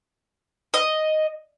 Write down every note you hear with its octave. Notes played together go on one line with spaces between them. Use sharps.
D#5